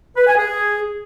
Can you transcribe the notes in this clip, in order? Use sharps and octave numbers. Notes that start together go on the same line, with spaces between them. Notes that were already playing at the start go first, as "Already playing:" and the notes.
B4
G#5
G#4